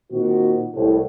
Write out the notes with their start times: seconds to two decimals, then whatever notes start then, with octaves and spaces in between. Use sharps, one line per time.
0.12 A#2 D#3 C4 D#4 F#4
0.74 C2 A2